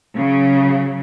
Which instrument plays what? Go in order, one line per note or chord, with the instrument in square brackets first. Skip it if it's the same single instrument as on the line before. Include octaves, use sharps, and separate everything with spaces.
[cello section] C#3 F#3